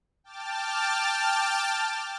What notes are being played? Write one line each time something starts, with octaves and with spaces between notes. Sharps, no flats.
G5 A5 D6 F6 A6